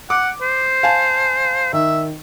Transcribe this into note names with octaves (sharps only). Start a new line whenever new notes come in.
F#5 D6
C5
F5 G#5 A5
D#3 E5